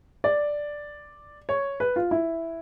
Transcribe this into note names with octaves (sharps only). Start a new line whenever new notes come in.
D5
C#5
B4
F4
E4